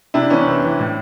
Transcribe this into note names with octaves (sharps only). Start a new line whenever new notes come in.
C3 D4 E4
E3 B3 C#4
C3 C4
E3
A2